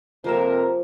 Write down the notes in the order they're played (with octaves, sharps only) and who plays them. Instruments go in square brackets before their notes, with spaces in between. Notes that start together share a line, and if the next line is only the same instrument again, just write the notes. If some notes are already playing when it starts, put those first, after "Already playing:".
[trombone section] F2 C3 A#4 [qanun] F3 A#3 E5